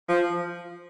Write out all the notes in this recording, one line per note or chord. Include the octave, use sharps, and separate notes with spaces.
F3